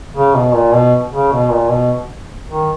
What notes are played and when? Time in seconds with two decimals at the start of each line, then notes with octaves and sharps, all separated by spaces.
0.15 C#3
0.35 B2
0.54 A#2
0.74 B2
1.12 C#3
1.32 B2
1.51 A#2
1.70 B2
2.49 D#3